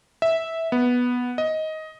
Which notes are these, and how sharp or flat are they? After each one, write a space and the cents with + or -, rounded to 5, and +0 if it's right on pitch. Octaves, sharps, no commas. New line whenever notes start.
E5 -10
B3 -5
D#5 +15